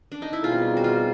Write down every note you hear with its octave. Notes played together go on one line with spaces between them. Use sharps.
D4
D#4
E4
B2 G3 C4 D#4 F4 G#4
F#4
F4